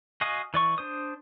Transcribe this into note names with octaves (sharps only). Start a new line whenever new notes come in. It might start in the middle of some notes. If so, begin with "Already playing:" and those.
F#4 D#5 F5 G#5 D#6
E3 D5 C#6
D4 C5 D#6